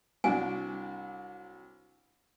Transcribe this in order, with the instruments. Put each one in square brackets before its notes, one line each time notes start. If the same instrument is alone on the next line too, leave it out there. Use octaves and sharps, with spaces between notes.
[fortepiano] C2 F#3 D4 [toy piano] G#5